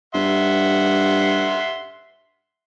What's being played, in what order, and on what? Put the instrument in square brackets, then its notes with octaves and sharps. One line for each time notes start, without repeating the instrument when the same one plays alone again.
[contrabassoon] G2 [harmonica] E5 F#5 C6